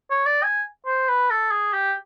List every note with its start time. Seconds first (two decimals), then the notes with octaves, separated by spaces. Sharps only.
0.10 C#5
0.26 D5
0.43 G#5
0.86 C5
1.08 B4
1.30 A4
1.52 G#4
1.73 G4